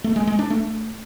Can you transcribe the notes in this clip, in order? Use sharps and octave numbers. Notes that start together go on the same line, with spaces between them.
A3
G#3
G#3
D4
A3